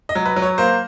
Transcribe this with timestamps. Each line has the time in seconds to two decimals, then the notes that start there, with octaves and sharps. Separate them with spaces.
0.09 D#5
0.15 F#3
0.26 B4
0.36 F#3
0.42 C#5
0.58 A#3 C5